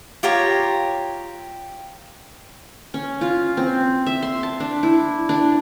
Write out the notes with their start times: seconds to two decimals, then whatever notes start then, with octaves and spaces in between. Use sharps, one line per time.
0.23 F4 G4 C#5 A#5
2.94 C#4
3.21 F4
3.57 C4
4.06 E5
4.23 C6
4.43 A5
4.60 D4
4.83 E4
5.29 D4